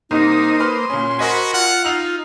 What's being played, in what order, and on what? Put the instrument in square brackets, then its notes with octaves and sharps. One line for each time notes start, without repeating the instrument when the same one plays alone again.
[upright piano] C2 [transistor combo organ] A#3 C5 D#6 [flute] D#4
[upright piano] B4 F6 [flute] C6
[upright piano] A#2 C#4
[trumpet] F#4 [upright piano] A#4 D#5 G#5 [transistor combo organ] C5 B5
[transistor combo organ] F4 [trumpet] F#5
[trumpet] D#4 [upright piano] E6 C7 F7